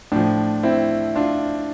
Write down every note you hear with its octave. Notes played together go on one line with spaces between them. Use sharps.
A2 F3 D4
C4 E4
D4 F4